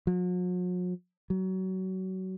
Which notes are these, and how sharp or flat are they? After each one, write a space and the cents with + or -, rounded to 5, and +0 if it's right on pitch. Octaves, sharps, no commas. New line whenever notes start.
F#3 -45
F#3 +25